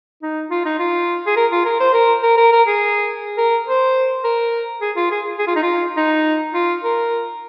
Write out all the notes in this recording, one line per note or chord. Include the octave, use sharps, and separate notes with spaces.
D#4
F4
D#4
F4
G#4
A#4
F4
A#4
C5
A#4
A#4
A#4
A#4
G#4
A#4
C5
A#4
G#4
F4
G#4
G#4
F4
D#4
F4
D#4
F4
A#4